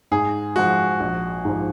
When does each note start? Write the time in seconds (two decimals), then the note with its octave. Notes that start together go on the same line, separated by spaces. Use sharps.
0.11 G#2 G#4
0.56 F3 G#3 F#4
1.00 A#1
1.45 G#2 F3